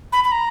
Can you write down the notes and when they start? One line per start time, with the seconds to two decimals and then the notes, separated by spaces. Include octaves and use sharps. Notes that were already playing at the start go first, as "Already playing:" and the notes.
0.12 B5
0.24 B5
0.32 A#5